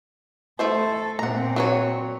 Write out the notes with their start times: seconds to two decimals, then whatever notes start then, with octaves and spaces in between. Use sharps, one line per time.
0.59 A3 E4 A4 C5
1.19 A#2 C4 F#5 A#5
1.56 F#3 B4 C#5